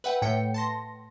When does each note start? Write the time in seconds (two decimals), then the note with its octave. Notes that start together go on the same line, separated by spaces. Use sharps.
0.04 B4 E5 F#5 G5
0.22 A2 G5 C#7
0.54 A5 C6 A#6